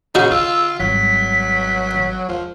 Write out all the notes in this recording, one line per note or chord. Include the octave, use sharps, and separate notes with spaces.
C#3 D#4 F#4 F#5 G6
D3 F4 E6
G#1 F#3 G3 B6
E1 F3